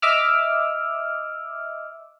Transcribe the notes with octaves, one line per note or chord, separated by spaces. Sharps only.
D#5 E5 D6 E6 F6